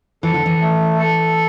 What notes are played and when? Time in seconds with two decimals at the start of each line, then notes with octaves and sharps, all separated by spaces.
0.23 E3 A4
0.34 D3
0.46 E3
0.61 A3
0.99 A4